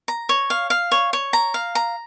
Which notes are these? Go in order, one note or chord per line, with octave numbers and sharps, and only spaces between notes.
A#5
C#5
F5
F5
C#5
C#5
A#5
F5
A#5